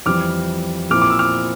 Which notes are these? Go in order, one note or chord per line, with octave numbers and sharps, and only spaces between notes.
F2 E3 G3 D6 F6
A#2 F3 C4 E4 D6 F6
D6
E6
D6 F6